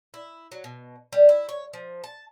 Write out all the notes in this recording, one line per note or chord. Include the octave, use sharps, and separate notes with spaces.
E4
F#3
B2
G3
E4
C#5
F3
A5